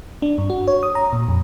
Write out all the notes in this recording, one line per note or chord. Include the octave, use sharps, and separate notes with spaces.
D4
G2
F#4
C#5
D#6
A#5
A#2
F2